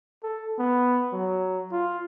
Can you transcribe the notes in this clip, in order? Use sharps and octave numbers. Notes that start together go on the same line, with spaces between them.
A4
B3
F#3
F4